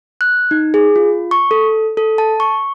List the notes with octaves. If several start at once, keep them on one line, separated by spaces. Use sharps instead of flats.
F#6
D#4
G#4
F4
C#6
A4
A4
A5
C#6